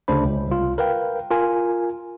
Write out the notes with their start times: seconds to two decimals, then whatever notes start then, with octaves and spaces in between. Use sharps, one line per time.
0.08 D2 C#3 D4 C5 B5
0.25 C#2
0.48 C2 F4
0.78 A#4 B4 F5 G5
1.31 F4 A#4 G#5